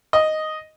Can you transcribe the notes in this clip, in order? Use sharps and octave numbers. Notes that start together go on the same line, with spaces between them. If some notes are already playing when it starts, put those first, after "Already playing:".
D#5